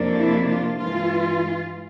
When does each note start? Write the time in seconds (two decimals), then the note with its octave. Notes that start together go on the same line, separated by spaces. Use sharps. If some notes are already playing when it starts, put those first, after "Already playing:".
Already playing: F2 C3 F3 A#3 D4
0.17 E4
0.47 F4
0.77 G2 E3 G#3 F4